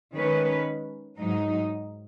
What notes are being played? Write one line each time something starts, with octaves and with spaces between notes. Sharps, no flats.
D#3 G#3 C#4 B4
G#2 F#3 D#4